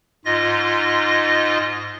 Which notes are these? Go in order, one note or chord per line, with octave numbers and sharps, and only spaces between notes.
G#2 F4 D#5 A#6